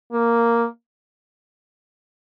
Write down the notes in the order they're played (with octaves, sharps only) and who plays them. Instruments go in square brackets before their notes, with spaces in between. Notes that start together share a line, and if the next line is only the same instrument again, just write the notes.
[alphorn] A#3